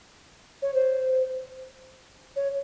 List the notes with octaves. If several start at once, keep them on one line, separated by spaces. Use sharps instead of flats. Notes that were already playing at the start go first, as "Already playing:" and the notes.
C#5
C5
C#5